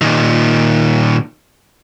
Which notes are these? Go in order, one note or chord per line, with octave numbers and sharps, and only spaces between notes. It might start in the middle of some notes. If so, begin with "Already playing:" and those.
A#2 D#3